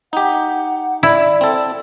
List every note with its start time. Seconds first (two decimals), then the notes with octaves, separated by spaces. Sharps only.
0.13 D#4 G4 F#5
1.03 E4 D5
1.41 C4 A4